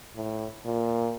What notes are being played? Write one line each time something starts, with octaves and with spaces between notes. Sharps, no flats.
A2
A#2